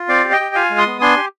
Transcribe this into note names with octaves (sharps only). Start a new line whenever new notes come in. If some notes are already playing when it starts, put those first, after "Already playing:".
Already playing: F4
C4 D5 F5
G4
D#5 G5
G4
F4 F5 G#5
G#3
C6 D#6
B3
D4 G#5 C6
G4